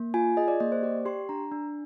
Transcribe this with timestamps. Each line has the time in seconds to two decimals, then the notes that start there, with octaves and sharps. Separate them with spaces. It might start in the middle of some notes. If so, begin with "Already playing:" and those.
Already playing: A#3
0.14 F4 G#5
0.37 G#4 D#5
0.48 D5
0.60 A#3 D#5
0.72 C5
0.83 G4 D5
1.05 G4 C6
1.29 D4 A#5
1.52 D4